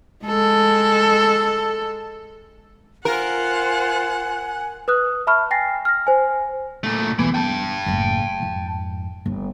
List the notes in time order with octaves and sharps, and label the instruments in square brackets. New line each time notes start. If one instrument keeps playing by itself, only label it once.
[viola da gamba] G#3 A4
[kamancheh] F4 C5 [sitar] A#4 [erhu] F#5 [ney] G#5
[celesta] B4 D#6 F#6
E5 A5 B5 C#6 F6
G5 G#5 A6 A#6 C7
F6 A#6
C5 G#5
[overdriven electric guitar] A#2 A3
[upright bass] E1 B2 [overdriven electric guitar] E3
[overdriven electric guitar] G5 A5
[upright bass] F#1 A2
F2 G#2
G1 D#3